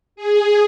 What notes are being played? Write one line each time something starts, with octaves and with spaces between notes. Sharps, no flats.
G#4